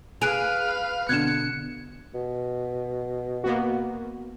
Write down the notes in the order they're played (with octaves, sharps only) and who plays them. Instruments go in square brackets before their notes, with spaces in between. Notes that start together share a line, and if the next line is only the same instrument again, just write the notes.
[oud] G#4 [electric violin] B4 F5 [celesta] F#6 D7 F7
[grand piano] B2 D3 E7 [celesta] F#6 G#6 [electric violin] C#7
[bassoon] B2
[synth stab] A#3 B3 F#4